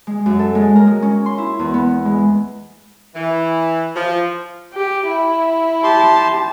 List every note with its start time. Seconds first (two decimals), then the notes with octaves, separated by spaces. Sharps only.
0.07 G#3
0.26 F#2
0.39 A4
0.55 G#3
0.75 A#4
0.87 G#3
1.02 C#4
1.26 C6
1.38 E4
1.59 E2
1.74 B3
2.05 G#3
3.15 E3
3.95 F3
4.73 G4
5.08 E4
5.83 G4 A5 C6